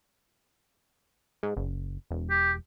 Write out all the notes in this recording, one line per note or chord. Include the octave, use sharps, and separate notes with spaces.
G#2
F#1
E1
G4